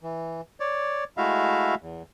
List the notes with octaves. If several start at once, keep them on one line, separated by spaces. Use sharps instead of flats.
E3
C#5 D5
G#3 A3 E4 F#4 E5 F5
E2